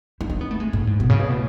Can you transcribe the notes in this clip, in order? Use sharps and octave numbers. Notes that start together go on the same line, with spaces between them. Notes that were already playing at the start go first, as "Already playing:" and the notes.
E4
D#4
B3
A3
G#3
A2
G#2
B2
C#3
B2
A2